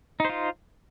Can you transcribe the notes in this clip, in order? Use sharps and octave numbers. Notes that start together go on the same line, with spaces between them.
D#4 F4 C5